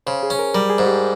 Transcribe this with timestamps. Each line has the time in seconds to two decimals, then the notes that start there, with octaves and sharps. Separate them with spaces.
0.07 C#3 C5
0.23 G#4
0.30 C#4
0.39 A#4
0.55 G3 A#4
0.70 G#4
0.78 G#2
0.86 G4